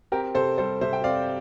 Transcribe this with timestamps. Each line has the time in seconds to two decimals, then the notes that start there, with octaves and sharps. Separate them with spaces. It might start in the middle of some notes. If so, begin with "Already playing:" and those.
0.12 C4 G4 A#4
0.35 C3 A4 C5
0.58 G3 A4 C5
0.81 C3 C5 E5
0.93 G5
1.04 C4 D5 F5